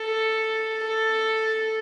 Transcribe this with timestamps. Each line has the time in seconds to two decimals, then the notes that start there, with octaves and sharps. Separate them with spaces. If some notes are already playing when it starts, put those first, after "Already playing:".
Already playing: A4
0.85 A4